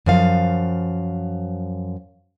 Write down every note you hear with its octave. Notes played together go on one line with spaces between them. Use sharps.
F#2 F3 F5